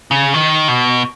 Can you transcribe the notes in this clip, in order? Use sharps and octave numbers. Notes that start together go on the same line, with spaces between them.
C#3
D#3
B2